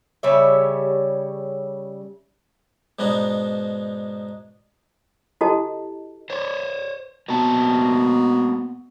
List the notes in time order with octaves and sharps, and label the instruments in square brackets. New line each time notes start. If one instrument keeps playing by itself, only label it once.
[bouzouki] C#3 G3 C#5 E5
[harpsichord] G#2 B2 B3 D4 D#4
[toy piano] E4 F#4 G4 A4 D#5 A5
[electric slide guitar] C5 C#5
[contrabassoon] B2 [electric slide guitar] A#3 C4 A5